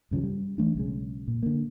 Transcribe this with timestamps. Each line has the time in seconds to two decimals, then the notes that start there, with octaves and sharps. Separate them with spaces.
0.11 G2 C#3 E3 F3
0.24 G3
0.58 E3 A3 D4
0.75 B1 C#3 G#3
1.28 A#2
1.43 D3 A#3